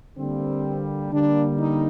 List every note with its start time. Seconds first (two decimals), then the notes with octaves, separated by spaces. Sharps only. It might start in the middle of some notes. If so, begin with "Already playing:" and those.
0.17 D3 G3 A#3 C4
1.11 D3 G3 A#3 D4
1.58 D#4